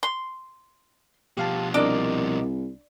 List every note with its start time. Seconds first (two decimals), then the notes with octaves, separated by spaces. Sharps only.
0.03 C6
1.37 B2 F3 G4 F5 A5
1.74 C2 D4 A#4 D#5 D6